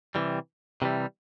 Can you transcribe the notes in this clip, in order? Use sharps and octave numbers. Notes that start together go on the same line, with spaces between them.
C3 E3 G3
C3 E3 G3